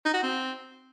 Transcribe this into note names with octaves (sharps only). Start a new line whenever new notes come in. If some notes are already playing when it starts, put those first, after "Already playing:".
D#4
F#4
C4